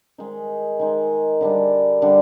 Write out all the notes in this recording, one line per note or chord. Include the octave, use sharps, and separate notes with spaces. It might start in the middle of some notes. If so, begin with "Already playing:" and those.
D#3 G#3 D#4
D#3 G#3 D#4
D3 G3 D4
D3 G3 D4